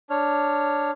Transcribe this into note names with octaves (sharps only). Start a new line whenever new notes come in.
D4 C#5 F6